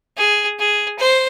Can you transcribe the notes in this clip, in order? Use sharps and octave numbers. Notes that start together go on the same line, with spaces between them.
G#4
G#4
C5